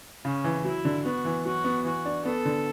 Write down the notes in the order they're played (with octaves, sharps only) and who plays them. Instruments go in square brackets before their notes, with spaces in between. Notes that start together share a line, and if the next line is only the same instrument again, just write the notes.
[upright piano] C#3 [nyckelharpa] C#4
[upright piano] E3
[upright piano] F#3 [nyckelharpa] E4
[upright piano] D3
[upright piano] B3 [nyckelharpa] F#4
[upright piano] E3
[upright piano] F#3 [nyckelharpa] F#4
[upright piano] B3
[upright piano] E3 [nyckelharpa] F#4
[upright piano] D4
[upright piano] B3 [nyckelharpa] A4
[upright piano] D3